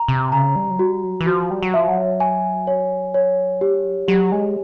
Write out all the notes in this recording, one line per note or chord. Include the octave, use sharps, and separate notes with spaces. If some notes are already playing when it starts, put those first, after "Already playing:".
Already playing: A#5
C3
C#3 A#5
G3
F#3
G3 F#4
F#3
E3
F3 F#4
G3
F#3
F3 E5
F#3
G#5
C#5
C#5
G3 G4
F#3
F#3 G4
G#3